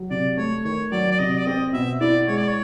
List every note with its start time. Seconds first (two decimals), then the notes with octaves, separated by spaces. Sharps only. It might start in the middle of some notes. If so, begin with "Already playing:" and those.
Already playing: F#3
0.10 C3 D5
0.37 A3 C#5
0.65 D#3 C#5
0.92 F#3 D5
1.11 D5
1.19 C3 D#5
1.38 D5
1.46 C4 D#5
1.73 B2 E5
2.01 E4 D5
2.27 G#3 C#5
2.38 D5
2.48 C#5